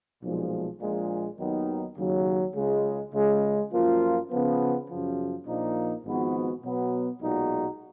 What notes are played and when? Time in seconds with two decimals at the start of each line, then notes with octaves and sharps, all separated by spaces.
0.22 B1 A#2 F3 G#3
0.81 A#1 A#2 F3 G#3
1.39 D#2 D#3 F#3 B3 D#4
1.97 D#2 C#3 F#3
2.55 C#2 C#3 G#3
3.14 C#2 C#3 G#3
3.72 F#2 F3 A#3 F4
4.31 C#3 F3 B3
4.88 F#2 C#3 F3
5.46 A#1 A#2 F3 A#3 D#4
6.05 G#1 G#2 F3 B3 F#4
6.63 B2 F#3 B3
7.21 B1 A#2 G#3 D#4 F#4